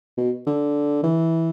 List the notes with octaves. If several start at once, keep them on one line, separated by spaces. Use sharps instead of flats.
B2
D3
E3